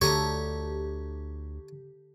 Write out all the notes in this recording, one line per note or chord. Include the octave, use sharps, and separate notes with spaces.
D2 D3 G4 A4 C#5 A#5